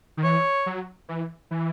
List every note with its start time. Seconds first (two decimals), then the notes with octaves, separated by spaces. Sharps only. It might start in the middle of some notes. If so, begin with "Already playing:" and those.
0.17 D#3
0.24 E3 C#5
0.66 F#3
1.09 E3
1.51 E3